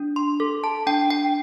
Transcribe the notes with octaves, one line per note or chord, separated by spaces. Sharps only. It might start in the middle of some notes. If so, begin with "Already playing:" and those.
Already playing: D4
C6
A4
A5
D4 G5
G5